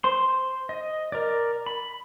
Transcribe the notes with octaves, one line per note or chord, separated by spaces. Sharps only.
C5 C6
D#5
A#4 D5
B5